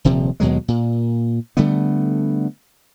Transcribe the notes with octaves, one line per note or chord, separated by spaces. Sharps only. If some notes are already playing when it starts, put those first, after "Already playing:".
D#1 C3 F3
D#2 B2 F#3 G#3
A#2
D3 G3 A3 B3